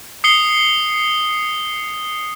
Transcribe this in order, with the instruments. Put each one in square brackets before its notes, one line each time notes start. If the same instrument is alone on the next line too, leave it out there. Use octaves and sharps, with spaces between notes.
[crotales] D#6 C7 C#7 G7